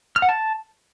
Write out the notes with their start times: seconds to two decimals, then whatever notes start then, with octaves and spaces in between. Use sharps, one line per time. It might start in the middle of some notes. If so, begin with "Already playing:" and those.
0.16 F6
0.22 F#5
0.29 A5